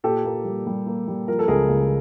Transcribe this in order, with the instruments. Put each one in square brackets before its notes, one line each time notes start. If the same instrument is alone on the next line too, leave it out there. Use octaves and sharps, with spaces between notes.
[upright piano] A#2 G4 A4
A#3
G3
G3
A#3
G3
F3 A#4
A4
C#2 G#4 A#4
C#2